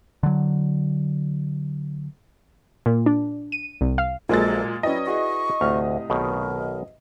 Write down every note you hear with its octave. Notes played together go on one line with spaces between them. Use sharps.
D3 F#3
A#2
D4
D#7
C2
F5
A#1 A#2 F#3 G#3 A4 A#4 D#5 A6
F#3 C#4 E4 B4 D5 D#5 G5
E4 F#4 G#4 C#6
D2 A2 C3 F6
B1 B2 D#3 A#4